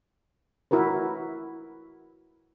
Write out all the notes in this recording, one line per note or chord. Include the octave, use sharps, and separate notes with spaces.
E4 F#4 A#4 B4